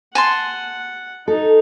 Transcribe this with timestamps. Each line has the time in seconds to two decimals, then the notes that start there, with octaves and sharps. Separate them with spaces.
0.15 F#5 G#5 A5 C6
1.28 D#4 A4